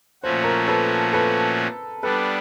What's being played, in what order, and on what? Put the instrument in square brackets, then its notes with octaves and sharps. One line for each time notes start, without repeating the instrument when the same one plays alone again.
[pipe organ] A#2 F3 A3 C#4 F#4 [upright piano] C5
[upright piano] A#4 C5
A4 B4
A4 B4
[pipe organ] G3 B3 D4 [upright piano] A4 B4